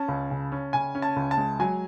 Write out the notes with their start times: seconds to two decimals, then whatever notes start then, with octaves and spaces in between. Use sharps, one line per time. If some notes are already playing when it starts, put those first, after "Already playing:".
Already playing: C#4 A5
0.08 C#2
0.31 C#3
0.52 C#4
0.73 C#3 G#5
0.95 C#4
1.02 A5
1.16 C#2
1.31 A5
1.38 G#3
1.60 F#3 G#5